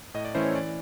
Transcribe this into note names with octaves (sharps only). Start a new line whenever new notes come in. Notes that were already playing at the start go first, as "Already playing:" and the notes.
A2 D#5
D5
E3 A3 C#4 E4 C5
C#5
E3 D5